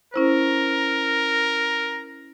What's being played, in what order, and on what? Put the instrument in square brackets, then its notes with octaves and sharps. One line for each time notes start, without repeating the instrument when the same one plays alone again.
[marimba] C#4 E4 C5 [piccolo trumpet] A#4